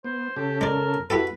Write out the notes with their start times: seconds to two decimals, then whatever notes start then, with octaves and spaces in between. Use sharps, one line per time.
0.04 B3 C5
0.36 C#3 G4 A4
0.61 G#3 A#4 D5
1.10 E4 F#4 G4 A4 B4